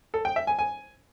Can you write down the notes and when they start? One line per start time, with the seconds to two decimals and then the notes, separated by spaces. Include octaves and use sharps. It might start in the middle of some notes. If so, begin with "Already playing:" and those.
0.14 A4
0.25 G5
0.36 E5
0.47 G#5
0.59 G#5